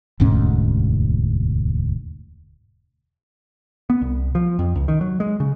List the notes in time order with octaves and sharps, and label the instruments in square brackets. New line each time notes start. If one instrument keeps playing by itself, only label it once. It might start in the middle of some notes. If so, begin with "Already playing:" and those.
[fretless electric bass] E1 D2 G#2 C#4
[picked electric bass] B3
C2
F3
F2
C#2
D#3
F#3
G#3
C#3